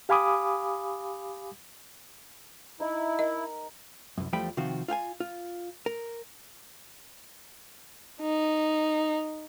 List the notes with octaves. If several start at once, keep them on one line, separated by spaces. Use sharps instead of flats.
G4 F5 G#5 B5 D6 D#6
D#4 E4 D#5
A#4 D#5
C2 F#2
E2 F3 G3 A3 G5 B5
C3 D#3 F3 C4 F#4 F5
F4 F5 G5 G#5
F4
A#4
D#4